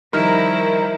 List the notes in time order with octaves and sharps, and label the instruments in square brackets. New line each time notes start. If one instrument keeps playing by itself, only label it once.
[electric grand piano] D#3 G3 D#4 [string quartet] F3 E4 [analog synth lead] A#4